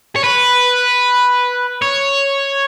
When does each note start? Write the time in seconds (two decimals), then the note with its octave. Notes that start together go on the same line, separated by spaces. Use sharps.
0.16 C#5
0.24 B4
1.82 C#5